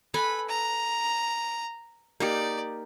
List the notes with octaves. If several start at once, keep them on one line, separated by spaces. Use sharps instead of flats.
A4 B4 G#5 B5
A#5
A#3 D#4 G4 D5